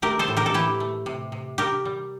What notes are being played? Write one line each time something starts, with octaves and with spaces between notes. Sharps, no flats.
A3 G4 A#4
A4 C5
A2
G4 A#4
A4
E3 E4 G4
A3
C3
C3
G3 G4 A#4
G3